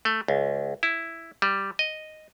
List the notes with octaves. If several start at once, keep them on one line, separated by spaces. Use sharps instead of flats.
A3
C#2
E4
G3
D#5